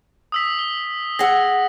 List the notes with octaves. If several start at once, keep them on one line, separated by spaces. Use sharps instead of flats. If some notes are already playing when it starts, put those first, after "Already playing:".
D#6 E6 B6
G7
G#4 F#5 E6 A#6